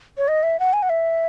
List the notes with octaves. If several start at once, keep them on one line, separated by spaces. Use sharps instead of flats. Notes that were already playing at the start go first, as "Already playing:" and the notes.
C#5
D#5
E5
F#5
G#5
F#5
E5